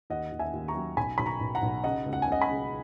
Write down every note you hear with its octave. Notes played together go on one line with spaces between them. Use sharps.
D#2 D#5 F#5
D#2
E5 G#5
D#2
A#5 C#6
F#3
B1 G#5 B5
B1 B5
A#5 C#6
B1
F#5 A#5
B1
C#3 D#5 F#5
C#2
F#5
G#5
C#2 D#5 F#5
G#5 B5
C#3